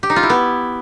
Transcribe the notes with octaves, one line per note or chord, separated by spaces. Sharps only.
G4
D#4
F4
E4
B3